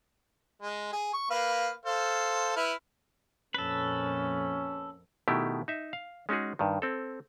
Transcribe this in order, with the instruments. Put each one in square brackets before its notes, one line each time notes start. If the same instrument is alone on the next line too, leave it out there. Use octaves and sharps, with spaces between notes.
[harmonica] G#3
G#4
C#6
A#3 B4 F5
A4 C5 F5
E4 B4 F6
[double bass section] F2 A#2 A#3 [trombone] C#4 [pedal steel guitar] A4 B4
[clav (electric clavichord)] B2 D#3 A3 E4 G4
D#4 E5
F5
G#3 C#4 D#4 F#4 G#4
G2 D#3
C4 A4